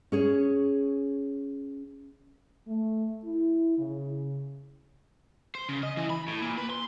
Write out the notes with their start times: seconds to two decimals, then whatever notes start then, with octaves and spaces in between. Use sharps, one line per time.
0.12 C#4 G#4 C#5
2.67 A3
3.24 E4
3.78 C#3
5.55 C5
5.69 C#3
5.83 D#5
5.97 E3
6.10 B5
6.28 A2
6.42 A#2
6.58 B4
6.70 C6